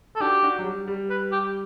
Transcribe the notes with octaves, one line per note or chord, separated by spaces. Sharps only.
A4
D4 F#4 G4
D4 F#4
F#3
G3
G3
B4
G4